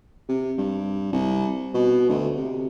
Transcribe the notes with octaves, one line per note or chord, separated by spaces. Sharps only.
C3
G2
C2
B2
D2
C3